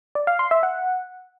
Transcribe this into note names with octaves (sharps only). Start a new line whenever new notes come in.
D5
F5
C6
E5
F#5